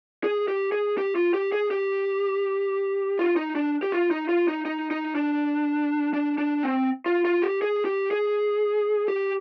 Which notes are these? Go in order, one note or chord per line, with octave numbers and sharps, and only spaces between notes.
G#4
G4
G#4
G4
F4
G4
G#4
G4
F4
D#4
D4
G4
F4
D#4
F4
D#4
D#4
D#4
D4
D4
D4
C4
F4
F4
G4
G#4
G4
G#4
G4